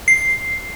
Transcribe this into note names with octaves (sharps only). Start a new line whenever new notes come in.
C7